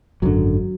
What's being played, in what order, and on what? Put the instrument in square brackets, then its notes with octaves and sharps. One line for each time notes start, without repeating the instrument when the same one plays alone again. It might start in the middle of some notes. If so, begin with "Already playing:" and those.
[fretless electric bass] G#1 F#2 D3 F#3